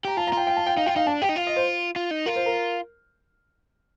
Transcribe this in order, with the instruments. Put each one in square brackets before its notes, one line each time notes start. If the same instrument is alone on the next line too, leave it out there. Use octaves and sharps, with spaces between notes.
[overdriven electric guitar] G4 [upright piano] A#5
[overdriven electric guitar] F4 [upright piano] A5
[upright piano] A#5
[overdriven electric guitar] F4 [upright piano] G5
[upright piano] G5
A5
G5
[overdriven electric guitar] D#4 [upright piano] F5
[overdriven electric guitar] F4 [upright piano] G5
[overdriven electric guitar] D#4 [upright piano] F5
[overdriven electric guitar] D4 [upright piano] A5
[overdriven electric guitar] G4 [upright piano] G5
[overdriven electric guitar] D#4
[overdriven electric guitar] F4 [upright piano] F5
[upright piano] D#5
C5
[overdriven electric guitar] F4
D#4
[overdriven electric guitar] F4 [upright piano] A#4
[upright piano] C5
A#4